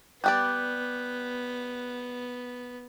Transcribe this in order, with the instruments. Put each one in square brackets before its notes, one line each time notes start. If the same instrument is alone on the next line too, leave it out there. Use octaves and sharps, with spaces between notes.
[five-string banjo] G3 G4 D5 [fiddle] B3 [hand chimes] F#6 G6